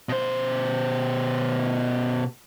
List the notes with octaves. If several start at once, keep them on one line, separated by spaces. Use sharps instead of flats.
B2 C5